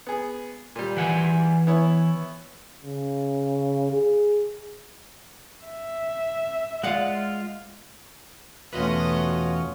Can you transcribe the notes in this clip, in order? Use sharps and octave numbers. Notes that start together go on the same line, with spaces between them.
B3 G#4
A#2 G3
E3 F#5 G#5
B3 E4 C#5
C#3
G#4
E5
G#3 F4 D5 F5 F#5
E2 B2 A3 C#4 F4 F#4 B4 D#5